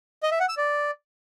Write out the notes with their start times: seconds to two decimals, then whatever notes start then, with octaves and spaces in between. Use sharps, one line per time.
0.23 D#5
0.31 E5
0.40 F#5
0.49 E6
0.57 D5